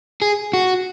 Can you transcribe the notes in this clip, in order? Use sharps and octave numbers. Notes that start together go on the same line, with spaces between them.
G#4
F#4